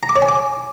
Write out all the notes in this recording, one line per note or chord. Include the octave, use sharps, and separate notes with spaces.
A#5
D6
C#5
G#5
D6